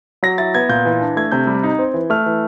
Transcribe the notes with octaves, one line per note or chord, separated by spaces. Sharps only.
F#3 A#6
E4 A6
B3 G#6
A#2 G6
E3
D4
A3 G#6
C3 G6
G3
D#4
C4
E3
A3 F6
E3